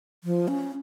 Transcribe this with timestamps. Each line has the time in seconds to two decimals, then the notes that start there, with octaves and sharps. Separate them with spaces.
0.24 F3
0.48 C#4